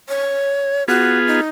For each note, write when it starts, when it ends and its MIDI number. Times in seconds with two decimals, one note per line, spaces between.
0.09 0.84 73
0.88 1.41 59
0.88 1.41 65
0.88 1.19 66
0.88 1.41 68
1.27 1.48 63